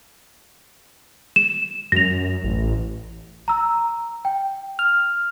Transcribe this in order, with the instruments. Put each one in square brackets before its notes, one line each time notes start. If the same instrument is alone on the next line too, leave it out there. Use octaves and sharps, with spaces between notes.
[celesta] E7
[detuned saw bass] F#2 [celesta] A#6 F7
[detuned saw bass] A1
[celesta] A#5 E6
G5
[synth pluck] F6